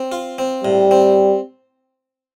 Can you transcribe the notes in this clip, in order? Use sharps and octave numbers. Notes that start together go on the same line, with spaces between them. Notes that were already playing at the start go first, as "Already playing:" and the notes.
Already playing: C4
F4
C4
A2 G3
C4